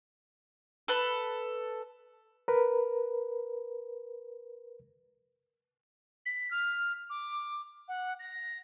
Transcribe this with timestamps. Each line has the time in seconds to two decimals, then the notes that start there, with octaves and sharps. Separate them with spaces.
0.88 A4 B4
2.48 A#4 B4
6.26 B6
6.51 F6
7.09 D6
7.88 F#5
8.19 A#6